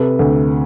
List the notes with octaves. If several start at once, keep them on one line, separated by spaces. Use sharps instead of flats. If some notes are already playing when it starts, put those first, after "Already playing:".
Already playing: C3 A4 B4
D2